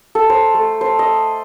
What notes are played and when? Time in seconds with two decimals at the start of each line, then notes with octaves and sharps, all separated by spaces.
0.15 A4
0.30 C5
0.55 A3
0.81 C5
0.99 D#5